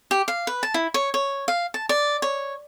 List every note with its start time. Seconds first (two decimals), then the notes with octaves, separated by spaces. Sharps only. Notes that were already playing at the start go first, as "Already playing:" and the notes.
0.11 G4
0.28 F5
0.47 B4
0.63 A5
0.74 E4
0.94 C#5
1.14 C#5
1.48 F5
1.74 A5
1.89 D5
2.22 C#5